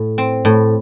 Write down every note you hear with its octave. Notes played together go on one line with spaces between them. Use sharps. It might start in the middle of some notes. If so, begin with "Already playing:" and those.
Already playing: A2
C4
A2